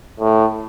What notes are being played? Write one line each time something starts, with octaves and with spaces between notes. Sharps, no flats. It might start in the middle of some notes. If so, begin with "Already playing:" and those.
A2